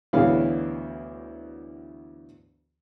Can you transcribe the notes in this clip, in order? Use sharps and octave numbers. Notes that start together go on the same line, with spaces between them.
D2 B2 E3 G#4 C#5 F5